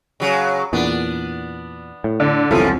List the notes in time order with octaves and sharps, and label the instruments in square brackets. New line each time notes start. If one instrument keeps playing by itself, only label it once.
[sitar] C#3 F#3
[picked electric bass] E2 A#2 [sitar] B3 D4
[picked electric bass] A2
[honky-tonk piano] D3
[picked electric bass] E1 C2 C3 [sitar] F#2 F3 [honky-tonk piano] E4 F4 A4